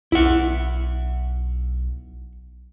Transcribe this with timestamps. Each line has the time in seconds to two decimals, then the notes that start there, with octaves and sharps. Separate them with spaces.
0.12 B1 E4 F#5